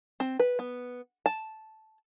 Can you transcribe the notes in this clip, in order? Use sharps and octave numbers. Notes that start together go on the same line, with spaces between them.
C4
B4
B3
A5